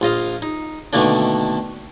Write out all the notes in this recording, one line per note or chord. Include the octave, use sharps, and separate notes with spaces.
A#1 F4 D#5 F5
D#4
B2 D3 D#3 A3 A#3 D4